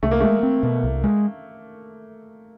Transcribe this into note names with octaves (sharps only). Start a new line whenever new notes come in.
C2 A3
A#3
G#3 A3
C4
B2
C2
G#3